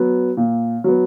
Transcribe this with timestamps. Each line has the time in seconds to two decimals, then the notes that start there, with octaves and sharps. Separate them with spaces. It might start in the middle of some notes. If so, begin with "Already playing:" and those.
Already playing: F#3 B3
0.37 A#2
0.84 F#3 B3